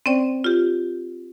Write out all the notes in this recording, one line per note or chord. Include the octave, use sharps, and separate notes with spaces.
C4 C#4 C5 D5 G5
F4 G4